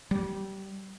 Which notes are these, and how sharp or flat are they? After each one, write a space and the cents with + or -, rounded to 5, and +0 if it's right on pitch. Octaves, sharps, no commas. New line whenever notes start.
G3 -20